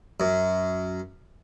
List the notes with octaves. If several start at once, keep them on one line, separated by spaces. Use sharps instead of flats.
F#2